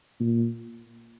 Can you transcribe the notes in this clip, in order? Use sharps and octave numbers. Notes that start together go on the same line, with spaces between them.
A#2